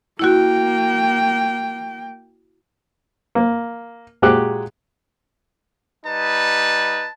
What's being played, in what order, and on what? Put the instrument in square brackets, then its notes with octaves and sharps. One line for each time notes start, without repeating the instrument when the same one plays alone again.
[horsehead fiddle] A#3 G5 [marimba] E4 F#4
[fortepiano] A#3
A#2 G#3 F#4 G4 D6 F#6
[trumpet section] G3 D#4 B4 [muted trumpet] A5